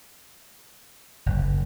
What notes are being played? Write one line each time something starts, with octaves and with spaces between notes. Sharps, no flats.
F#1